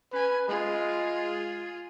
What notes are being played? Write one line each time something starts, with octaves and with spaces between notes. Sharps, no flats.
C#4 B4 G#5
G#3 F4 G#4